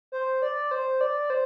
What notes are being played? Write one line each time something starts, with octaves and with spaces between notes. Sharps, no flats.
C5
D5
C5
D5
C5